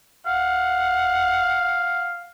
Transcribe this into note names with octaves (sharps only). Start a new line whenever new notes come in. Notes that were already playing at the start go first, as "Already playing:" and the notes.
F5 F#5